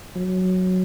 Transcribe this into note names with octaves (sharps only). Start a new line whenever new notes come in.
F#3